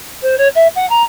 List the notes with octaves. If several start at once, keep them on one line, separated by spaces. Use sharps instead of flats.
C5
C#5
E5
F#5
A#5